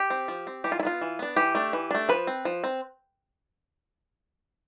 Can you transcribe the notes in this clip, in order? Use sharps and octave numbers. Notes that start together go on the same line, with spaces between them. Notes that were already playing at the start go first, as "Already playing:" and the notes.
Already playing: G4
C4
F3
C4
E3 G4
F4
E4
B3 D4 F4
E3
B3 D4
E3 G4
A3 D4
E3
A3 D4
F3 B4
C4
F3
C4